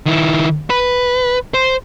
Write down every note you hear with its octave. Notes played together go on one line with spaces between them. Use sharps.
D#3 E4
B4
C5